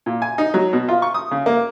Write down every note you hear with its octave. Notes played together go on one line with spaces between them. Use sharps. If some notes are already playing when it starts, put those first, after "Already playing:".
A#2
G#5
D#4
F#3
B2
F4
C#6
D#6
C#3
A#3